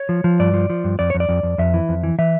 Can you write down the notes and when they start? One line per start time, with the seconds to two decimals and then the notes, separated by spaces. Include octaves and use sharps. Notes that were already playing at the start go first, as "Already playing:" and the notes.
Already playing: C#5
0.09 F3
0.24 F3
0.39 G2 D5
0.54 F3
0.70 F3
0.84 G2
0.99 F2 D5
1.10 F2 C#5
1.20 D5
1.29 F2
1.43 F2
1.58 F2 E5
1.74 E3
1.89 F2
2.03 E3
2.18 E3 E5